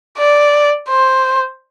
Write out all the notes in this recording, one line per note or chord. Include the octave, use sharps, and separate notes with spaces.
D5
C5